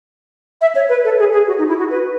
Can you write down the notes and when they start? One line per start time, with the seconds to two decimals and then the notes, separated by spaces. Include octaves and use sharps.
0.61 E5
0.75 C#5
0.89 B4
1.05 A4
1.19 G#4
1.32 G#4
1.47 F#4
1.58 D#4
1.68 E4
1.79 F#4
1.90 B4